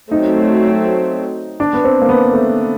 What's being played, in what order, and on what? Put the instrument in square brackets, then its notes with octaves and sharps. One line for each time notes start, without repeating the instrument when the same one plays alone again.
[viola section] F#3 A3 C4 [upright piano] D#4
[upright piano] D4
B3
C4
A#3
B3
A3